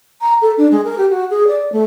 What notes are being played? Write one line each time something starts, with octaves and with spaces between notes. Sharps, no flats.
A#5
A4
D4
G#3
A#4
G4
F#4
G#4
D5
A3